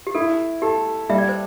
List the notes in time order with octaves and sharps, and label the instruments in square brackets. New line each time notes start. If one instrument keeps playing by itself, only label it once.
[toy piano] G4
[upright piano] E4 [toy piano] A4
[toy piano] G4 [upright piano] A4
[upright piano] G3 [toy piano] E5
[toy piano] D5
C5